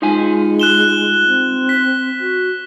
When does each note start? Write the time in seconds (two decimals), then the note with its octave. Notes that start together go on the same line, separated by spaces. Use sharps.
0.02 G#3 D#4 F4 G#5
0.59 F#6 E7 G7
1.27 C4
1.69 B6
2.20 F#4